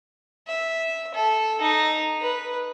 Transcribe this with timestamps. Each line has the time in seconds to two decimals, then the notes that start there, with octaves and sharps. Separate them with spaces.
0.47 E5
1.14 A4
1.61 D#4
2.20 B4